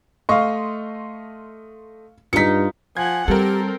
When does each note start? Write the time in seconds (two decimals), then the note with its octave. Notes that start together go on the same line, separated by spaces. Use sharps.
0.29 A3 D#5 F5 C6 C#6
2.33 G2 D#4 F4 B6 C#7
2.97 F3 F#5 G#5 G#6
3.28 G3 C4 G4 A4 A#4